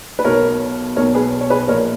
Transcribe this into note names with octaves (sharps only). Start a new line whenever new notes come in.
B4
B1 B2 A#4 C#5
B1 B2 A#4 C#5
G#4 B4
C#5
G#4 B4
A#1 A#2 A#4 C#5